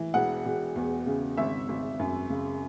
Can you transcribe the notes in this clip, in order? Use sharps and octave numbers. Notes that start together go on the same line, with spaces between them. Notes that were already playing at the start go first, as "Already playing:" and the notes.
Already playing: E3
E1 F#5
E1
E2
C#3
G#1 E5
G#1
F#2
C#3